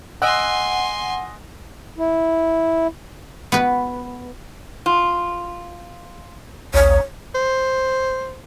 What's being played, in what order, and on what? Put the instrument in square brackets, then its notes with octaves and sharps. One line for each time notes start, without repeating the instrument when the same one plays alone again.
[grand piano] D#5 E6 F#6 [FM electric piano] F#5 [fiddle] G#5 C6
[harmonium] E4
[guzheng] B3 F#4 B4
[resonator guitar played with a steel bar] F4
[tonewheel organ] A#1 D#2 [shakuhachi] C#5
[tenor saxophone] C5